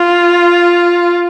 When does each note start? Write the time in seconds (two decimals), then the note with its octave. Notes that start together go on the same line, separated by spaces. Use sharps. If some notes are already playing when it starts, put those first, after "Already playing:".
Already playing: F4